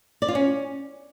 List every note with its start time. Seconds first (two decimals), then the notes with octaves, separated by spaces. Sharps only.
0.22 D5
0.28 F4
0.35 C#4